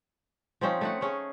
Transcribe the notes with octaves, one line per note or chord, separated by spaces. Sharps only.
F3 C4 C#4 D#4
A3 D#4 F#5
A3 C#4 G#4